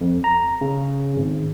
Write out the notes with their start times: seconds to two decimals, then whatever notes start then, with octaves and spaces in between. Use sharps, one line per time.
0.01 F2
0.24 A#5
0.61 C#3
1.16 G#1